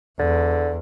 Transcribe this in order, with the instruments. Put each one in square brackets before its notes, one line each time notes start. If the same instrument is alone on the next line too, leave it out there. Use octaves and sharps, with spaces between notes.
[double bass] E2 [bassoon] D3